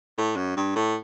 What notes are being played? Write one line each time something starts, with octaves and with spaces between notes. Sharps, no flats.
A2
F#2
G2
A2